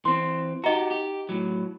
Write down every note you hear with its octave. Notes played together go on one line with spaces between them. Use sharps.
E3 C4 C6
D#4 F#4 G4 D#5 A#5
G4
A2 F#3